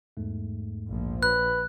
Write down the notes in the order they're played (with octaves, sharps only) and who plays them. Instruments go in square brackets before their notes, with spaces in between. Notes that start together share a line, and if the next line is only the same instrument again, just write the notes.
[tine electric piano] E2 G#2 A3
[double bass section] A#1 F3
[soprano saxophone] B4 [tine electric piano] C#5 [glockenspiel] F#6